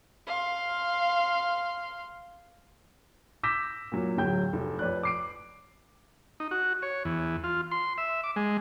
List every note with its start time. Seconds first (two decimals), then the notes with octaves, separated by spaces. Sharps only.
0.27 F5 C6
3.43 D6 E6 G6 A#6 B6 E7
3.92 A#2 F#3
4.18 D1 F#3 G5 G6
4.53 F1
4.79 F2 B4 C#5 D5 F#6
5.03 D6 C7 D7
6.40 D#4
6.51 F#4
6.82 C#5
7.05 E2
7.44 F4
7.72 C6
7.98 E5
8.24 D6
8.36 G#3